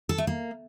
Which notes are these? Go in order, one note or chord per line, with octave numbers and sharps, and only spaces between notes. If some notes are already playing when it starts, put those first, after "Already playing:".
A4
A3
A#3